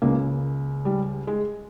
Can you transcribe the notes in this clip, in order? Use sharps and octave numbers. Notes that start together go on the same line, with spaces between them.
C#2 C#3 A#3
G3
G#3